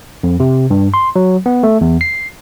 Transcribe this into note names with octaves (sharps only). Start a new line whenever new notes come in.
F2
C3
G2
C6
F#3
B3
A3
E2
C7